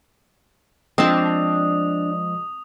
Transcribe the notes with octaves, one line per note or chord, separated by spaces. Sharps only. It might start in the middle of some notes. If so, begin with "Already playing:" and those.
F3 G#3 C4 D4 D#5 A5 D#6